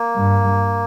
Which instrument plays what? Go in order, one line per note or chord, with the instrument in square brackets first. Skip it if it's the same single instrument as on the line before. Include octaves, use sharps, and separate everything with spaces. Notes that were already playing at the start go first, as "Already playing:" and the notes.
Already playing: [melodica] A#3
[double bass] G2